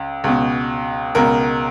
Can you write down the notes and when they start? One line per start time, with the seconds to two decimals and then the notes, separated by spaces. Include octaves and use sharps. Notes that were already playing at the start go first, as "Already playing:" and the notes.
Already playing: C#2
0.24 C#2 B2
1.15 C#2 B2 A#4